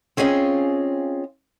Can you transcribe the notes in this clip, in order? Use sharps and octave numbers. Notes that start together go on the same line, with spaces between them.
C4 C#4 F4 G#4 D#5 F5